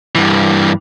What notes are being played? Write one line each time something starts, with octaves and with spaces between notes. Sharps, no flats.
G2 E3